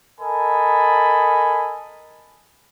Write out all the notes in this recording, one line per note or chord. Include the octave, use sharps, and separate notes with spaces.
A4 A#4 D#5 G#5 B5